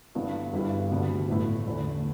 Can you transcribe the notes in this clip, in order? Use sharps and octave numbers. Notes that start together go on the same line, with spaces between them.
G1 G2 E3 B3
G1 G2 E3 G3 E4
D2 D3 G3 B3
A1 A2 A3 E4
E2 D3 A3 E4